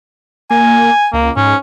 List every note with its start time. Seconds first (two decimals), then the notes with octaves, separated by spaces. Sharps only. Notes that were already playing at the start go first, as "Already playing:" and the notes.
0.51 A#3 G#5
1.13 C#2 A#3
1.37 G#2 C#4